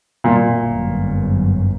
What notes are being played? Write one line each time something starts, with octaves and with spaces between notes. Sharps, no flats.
A#2
G1 F#2